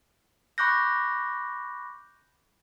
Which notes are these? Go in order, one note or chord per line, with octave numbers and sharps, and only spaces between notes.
B5 C#6 D6 F#6 G6 A#6